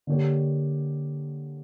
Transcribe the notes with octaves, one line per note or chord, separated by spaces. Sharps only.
D3 A#3 D4 G4 C#5